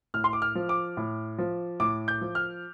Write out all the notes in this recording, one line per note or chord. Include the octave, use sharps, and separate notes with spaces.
A2 F6
C6
D6
F6
F3
D6
A2
F3
A2 D6
G6
F3
F6